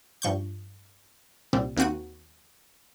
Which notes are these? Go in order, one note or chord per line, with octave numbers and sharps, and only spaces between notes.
G2 F3 C#6 G6
C2 A#2 G3 C4
D#2 A#3 C4 F#4 D#7